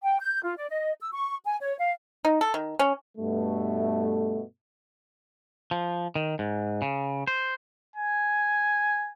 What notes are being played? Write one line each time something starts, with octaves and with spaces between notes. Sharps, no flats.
G5
G6
F4
D5
D#5
E6
C#6
G#5
C#5
F5
D#4
A4
D#3
C#4
G2 B2 A3
F3
D#3
G#2
C#3
C5
G#5